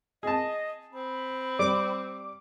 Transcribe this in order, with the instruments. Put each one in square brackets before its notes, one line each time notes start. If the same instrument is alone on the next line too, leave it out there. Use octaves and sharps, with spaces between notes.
[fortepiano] G#4 A5 [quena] D#5
[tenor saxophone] C4 [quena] B5
[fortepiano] G3 [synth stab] D6